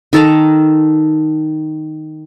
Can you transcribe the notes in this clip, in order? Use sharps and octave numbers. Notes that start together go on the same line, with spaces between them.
D#3 A4 A5 A#5